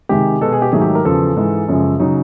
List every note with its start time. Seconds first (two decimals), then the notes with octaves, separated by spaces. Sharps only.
0.09 C3 D#3 G#3 G4
0.41 B2 G#3 A4
0.52 G#4
0.62 G4
0.72 G#2 D#3 F#3 A3 G#4
0.81 G4
0.95 A#4
1.05 E2 C#3 F3 A4
1.37 G#2 E3 G#3
1.68 F#2 C#3 F3 G#3
2.00 C#3 F#3 D#4